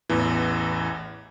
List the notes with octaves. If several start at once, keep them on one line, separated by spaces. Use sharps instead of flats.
A1 E2 E3